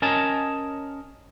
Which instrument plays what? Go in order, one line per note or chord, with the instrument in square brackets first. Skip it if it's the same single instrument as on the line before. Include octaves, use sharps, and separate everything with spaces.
[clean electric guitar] C#4 A#4 D#5 G#5 A5